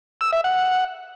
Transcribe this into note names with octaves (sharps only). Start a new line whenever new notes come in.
E6
E5
F#5